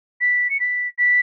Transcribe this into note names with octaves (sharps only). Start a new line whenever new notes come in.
B6
C#7
B6
B6